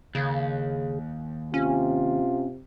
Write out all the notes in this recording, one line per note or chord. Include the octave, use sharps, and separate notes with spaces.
D#2 C#3
C3 C#4 F4